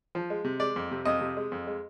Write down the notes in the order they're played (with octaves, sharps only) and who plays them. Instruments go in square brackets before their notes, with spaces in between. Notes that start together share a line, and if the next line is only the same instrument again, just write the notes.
[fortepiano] F3
G#3
C3
G#3 D5
F2
C3
F2 D#5
C3
G#3
F2
G#3